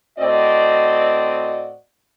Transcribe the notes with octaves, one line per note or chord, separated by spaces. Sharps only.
A2 C4 F#4 D5 D#5